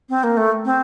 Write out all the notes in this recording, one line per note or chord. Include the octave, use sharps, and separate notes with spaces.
C4
A#3
A3
C4